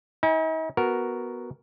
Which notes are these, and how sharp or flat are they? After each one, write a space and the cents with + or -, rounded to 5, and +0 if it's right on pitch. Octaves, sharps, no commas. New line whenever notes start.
D#4 +45 G#5 -20
B3 +0 F#4 +0 A#4 +0